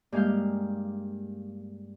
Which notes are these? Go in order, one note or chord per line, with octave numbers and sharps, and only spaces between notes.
G2 G#3 A#3 G4 F5 G6